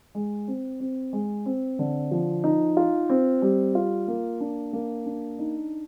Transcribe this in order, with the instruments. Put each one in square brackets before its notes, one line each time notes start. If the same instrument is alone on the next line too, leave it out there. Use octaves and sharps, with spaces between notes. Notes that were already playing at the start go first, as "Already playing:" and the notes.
[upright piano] G#3
C4
C4
G#3
C4
D3
F3
D#4
F4
C4
G3
F4
A#3
D4
A#3
D4
D#4